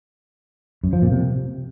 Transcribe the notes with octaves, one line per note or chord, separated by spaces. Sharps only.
F#2
F3
A#2
C3